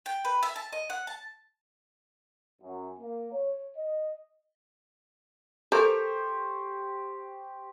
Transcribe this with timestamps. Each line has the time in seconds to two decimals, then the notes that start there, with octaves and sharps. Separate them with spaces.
0.06 G5
0.25 B4
0.43 E5
0.56 A5
0.73 D#5
0.90 F#5
1.07 A5
2.62 F#2
3.00 A#3
3.32 C#5
3.77 D#5
5.72 G4 A4 A#4 C5 C#6